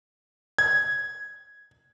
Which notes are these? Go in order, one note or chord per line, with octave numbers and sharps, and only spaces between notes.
G#6